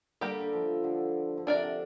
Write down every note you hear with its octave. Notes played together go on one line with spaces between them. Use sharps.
D3 G3 A#3 G4
D3
F3
D3
D3
C3 D4 A#4 D5
D3